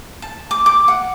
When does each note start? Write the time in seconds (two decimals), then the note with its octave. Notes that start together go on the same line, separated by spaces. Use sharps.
0.22 A5
0.51 D6
0.66 D6
0.88 F#5